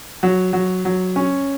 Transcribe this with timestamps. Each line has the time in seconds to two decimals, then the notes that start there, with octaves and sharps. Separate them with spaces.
0.23 F#3
0.53 F#3
0.85 F#3
1.16 C#4